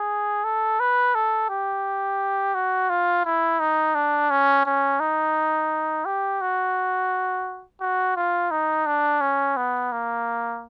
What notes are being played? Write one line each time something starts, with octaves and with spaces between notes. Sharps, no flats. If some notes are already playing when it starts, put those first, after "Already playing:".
Already playing: G#4
A4
B4
A4
G4
F#4
F4
E4
D#4
D4
C#4
C#4
D#4
G4
F#4
F#4
F4
D#4
D4
C#4
B3
A#3